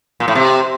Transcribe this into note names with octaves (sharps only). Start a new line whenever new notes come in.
A#2
A2
C3